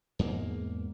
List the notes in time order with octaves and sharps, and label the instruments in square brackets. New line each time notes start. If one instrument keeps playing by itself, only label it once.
[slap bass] E2 G#2 A#3